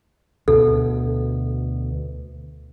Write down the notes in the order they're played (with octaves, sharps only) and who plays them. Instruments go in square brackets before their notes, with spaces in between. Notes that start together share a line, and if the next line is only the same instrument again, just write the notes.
[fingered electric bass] D2 B2 [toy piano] A4